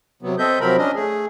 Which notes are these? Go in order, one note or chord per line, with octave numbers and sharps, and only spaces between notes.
C3 F#3 B3
C4 A4 D#5 E5 G6
C3 F3 F#3 C4 A#4 B5
C#4 D4 D#5
A3 G#4